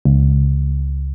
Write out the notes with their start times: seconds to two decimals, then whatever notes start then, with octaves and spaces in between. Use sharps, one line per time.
0.05 C#2